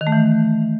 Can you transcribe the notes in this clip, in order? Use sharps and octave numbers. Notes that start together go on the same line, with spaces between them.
D#3
A3
E3